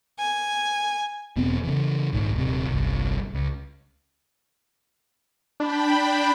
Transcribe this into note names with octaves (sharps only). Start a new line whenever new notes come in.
G#5
E1 B3 C4
C#3 E3
A#1 G#2 D#3
D#1 C3
G1 C2
C#2
D4 G5 B5